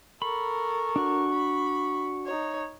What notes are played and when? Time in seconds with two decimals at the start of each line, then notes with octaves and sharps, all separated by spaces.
0.22 A4 A#4 B5 C#6
0.96 D4 F#4
1.33 B5
2.26 D#4 C#5